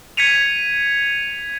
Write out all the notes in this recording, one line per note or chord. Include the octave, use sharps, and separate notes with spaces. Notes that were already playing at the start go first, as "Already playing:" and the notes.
G#6 B6 C#7 D#7 F7